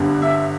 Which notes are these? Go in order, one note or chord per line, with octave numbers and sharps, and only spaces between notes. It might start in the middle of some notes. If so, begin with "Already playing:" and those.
Already playing: G1 G2 D3
E5